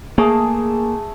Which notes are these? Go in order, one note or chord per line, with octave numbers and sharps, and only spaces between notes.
A3 A#3 G#4 A5